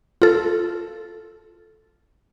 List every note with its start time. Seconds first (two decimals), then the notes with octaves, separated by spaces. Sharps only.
0.22 F4 A4